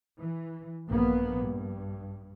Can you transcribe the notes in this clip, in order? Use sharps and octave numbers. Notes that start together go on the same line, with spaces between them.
E3
A#1 G2 A#3 B3
G2